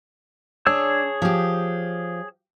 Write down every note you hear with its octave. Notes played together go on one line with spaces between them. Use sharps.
D4 G#4 C#5 E6
F3 G4